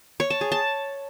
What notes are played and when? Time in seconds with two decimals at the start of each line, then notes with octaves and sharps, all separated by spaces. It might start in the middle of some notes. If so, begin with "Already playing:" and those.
0.20 C#5
0.30 A5
0.41 G#4
0.52 A5